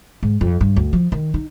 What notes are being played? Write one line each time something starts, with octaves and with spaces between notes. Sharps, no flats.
G#2
F2
G2
D2
F3
D#3
D#4